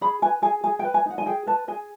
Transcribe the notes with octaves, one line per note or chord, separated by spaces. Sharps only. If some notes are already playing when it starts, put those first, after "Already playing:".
G#4 B5
B4 G#5
G#4 G#5
G#4 G#5
G5
B4
G#5
D#4 F#5
G#5
G#4 G5
B4 A5
G#4 G#5